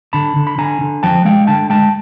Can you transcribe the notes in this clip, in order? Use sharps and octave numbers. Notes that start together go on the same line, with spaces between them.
D3 A5 B5
D3
B5
D3 G#5 A#5
D3
F3 G5 A5
G#3 F5 G5
D3 G5 A5
G#3 G5 A5